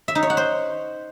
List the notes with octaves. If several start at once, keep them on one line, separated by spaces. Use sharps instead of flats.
E5
D#4
C#5
F#5
C5